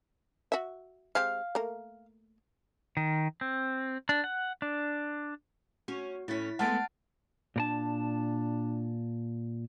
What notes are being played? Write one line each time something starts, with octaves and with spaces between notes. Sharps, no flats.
F#4 E5
G#3 C4 G4 F5
A3 A#3 A#4
D#3
C4
D4
F#5
D4
C#4 F#4
A2 C#4 E4 A6 B6
G#3 A3 B3 F#5 A5 F6 A6 D7
A#2 D4 A#4 A5